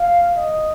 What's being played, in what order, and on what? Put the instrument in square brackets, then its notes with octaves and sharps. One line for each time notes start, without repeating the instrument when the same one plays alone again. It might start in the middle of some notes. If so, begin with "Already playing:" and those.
Already playing: [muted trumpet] F5
D#5